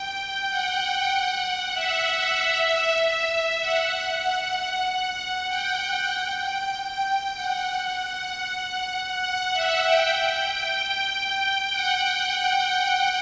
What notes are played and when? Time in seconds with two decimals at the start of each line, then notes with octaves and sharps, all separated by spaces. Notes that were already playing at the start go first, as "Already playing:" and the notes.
Already playing: G5
0.49 F#5
1.74 E5
2.37 E5
2.99 E5
3.61 F#5
5.48 G5
7.35 F#5
9.22 F#5
9.53 E5
9.84 G5
10.47 G5
11.72 F#5